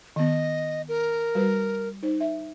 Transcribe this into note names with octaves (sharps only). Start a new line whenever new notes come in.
D#3 B3 D#5
A#4
G3 F#4 B4
D#4 C5
E5